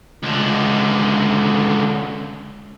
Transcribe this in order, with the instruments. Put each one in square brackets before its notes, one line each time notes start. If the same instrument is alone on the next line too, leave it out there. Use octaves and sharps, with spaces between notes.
[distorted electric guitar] C#2 D3